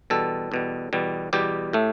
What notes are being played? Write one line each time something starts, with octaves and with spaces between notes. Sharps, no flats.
E2 B2 G3 A4
E2 B2 G3
E2 B2 G3
E2 B2 G3 G4
A2 A3